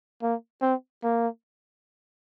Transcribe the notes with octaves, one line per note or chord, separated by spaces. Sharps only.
A#3
C4
A#3